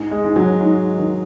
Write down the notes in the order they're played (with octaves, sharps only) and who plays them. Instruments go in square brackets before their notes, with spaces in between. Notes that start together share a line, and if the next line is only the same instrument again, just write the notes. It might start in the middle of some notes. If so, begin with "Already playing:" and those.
Already playing: [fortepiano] G#2
[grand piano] G#3
[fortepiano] G#2
[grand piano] F#3
[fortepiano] G#2
D#3